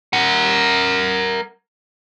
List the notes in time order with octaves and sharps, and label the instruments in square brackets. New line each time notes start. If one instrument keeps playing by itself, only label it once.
[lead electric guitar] A#4 F#5